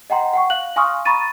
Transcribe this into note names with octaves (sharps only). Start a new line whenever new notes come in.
D#5 F#5 G5 A#5 C6
F#5 G5 C#6
F5 F#6 F#7
F5 G#5 C6 C#6 D#6 F6
A#5 B5 C#6 A6 D#7